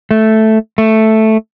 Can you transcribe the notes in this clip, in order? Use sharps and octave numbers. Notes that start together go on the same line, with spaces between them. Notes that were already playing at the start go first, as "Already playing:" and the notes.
A3
A3